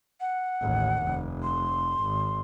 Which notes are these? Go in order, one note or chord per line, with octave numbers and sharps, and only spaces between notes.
F#5
A1 D#2
F1
C6
G#1